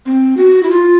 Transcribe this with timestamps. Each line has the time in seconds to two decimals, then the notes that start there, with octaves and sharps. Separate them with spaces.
0.06 C4
0.37 F#4
0.63 E4
0.70 F4